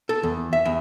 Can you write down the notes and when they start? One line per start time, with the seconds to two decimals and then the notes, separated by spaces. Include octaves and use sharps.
0.09 A4
0.23 E2
0.53 E5
0.65 E2